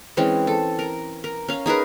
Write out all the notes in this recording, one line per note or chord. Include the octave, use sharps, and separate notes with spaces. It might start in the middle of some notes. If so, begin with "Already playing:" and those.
E3 G#3 C4 C#4
A4
A#4
A#4
C#4 F5
D#4 G#4 A#4 B4